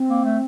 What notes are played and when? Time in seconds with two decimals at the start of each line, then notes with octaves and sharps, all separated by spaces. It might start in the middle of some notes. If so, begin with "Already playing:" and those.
Already playing: C4
0.08 A#3
0.24 A3